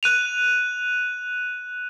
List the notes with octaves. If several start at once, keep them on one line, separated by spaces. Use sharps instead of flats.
F#6 D#7 F7